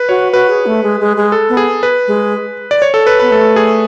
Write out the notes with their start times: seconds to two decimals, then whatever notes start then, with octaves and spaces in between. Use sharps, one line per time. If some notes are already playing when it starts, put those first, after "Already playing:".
Already playing: B4
0.09 F#4 C#5
0.33 F#4 B4
0.50 G#4
0.66 A3
0.83 G#3
1.00 G#3
1.17 G#3
1.32 A4
1.49 B3
1.57 G#4
1.83 B4
2.07 G#3
2.71 D5
2.82 C#5
2.94 A4
3.07 B4
3.20 B3 B4
3.31 A3 A4
3.56 G#4